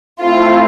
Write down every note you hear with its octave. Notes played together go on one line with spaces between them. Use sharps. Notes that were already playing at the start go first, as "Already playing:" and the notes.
A3 C4 E4 F4